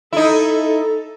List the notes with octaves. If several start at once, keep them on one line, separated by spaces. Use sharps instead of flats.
D#4 E4 A4